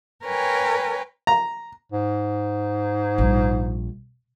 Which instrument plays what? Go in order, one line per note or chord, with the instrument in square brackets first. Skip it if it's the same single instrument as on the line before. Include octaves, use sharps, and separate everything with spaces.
[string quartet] A#4 B4 C#5 G5 G#5
[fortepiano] A#5
[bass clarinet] G#2
[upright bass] A#1 G3